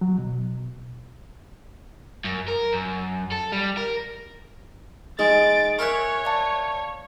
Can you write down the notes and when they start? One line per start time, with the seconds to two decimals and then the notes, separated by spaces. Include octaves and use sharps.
0.01 F#3
0.18 B2
2.24 F#2
2.48 A#4
2.73 F#2
3.32 A4
3.52 G3
3.77 A#4
5.19 G#3 D#4 G#4 A6 D7
5.79 A#4 C#5 E5 G#5 F#6
6.25 D5 F5 A5